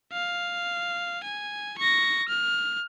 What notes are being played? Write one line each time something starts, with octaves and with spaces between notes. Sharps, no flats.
F5
G#5
C#6 A#6
F6